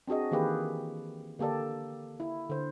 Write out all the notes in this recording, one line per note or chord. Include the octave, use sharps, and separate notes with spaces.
C4 D4 F#4 G#4 D#5
D#3 E3 A#3 G4 G#4 B4
D3 A#3 G4 A4 D5
E4
D3 C5